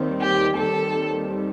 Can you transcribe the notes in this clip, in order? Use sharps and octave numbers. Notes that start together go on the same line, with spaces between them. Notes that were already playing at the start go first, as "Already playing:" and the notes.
Already playing: D#2 D#3 G3 C4
G4
D#2 D#3 G3 C4 A4